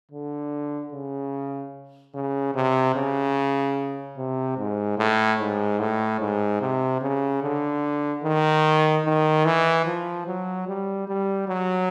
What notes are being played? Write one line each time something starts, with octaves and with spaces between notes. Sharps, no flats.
D3
C#3
C#3
C3
C#3
C3
G#2
A2
G#2
A2
G#2
C3
C#3
D3
D#3
D#3
E3
F3
F#3
G3
G3
F#3